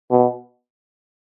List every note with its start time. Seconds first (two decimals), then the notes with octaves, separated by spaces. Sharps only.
0.11 B2